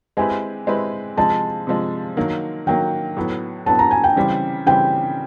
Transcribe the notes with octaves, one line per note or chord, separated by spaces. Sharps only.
G#3 C4 E4 G4 B4 G#5
G#3 C4 E4 G4 B4
C3 F3 G#3 A5
C3 F3 G#3
D#3 F#3 A#3
D#3 F#3 A#3 G5
A2 F#3 B3
A2 F#3 B3 A5
A#5
G#5
G5
C#3 E3 G3 C4
C#3 E3 G3 C4 G5